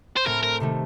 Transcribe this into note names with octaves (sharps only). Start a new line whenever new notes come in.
C5
A2 A3 C4 A#4
A#4
C3 D#3 A3